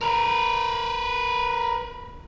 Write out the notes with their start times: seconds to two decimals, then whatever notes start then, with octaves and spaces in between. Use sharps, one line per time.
0.01 A#4 B4